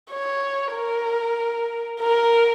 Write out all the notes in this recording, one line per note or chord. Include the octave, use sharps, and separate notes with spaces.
C#5
A#4
A#4